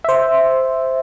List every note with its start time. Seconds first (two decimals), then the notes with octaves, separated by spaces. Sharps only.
0.04 C5 E5